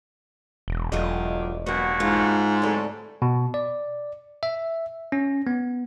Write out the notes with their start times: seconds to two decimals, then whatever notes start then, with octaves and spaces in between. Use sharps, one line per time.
0.68 E1
0.92 E1 D#2 F#3 A3 F4 G4 D#5
1.66 G2 A#2 F#3 B3 F#4
2.00 G#2 F4
2.62 D2 A2 C3 F#3 A4
3.22 B2
3.54 D5
4.43 E5
5.12 C#4
5.47 B3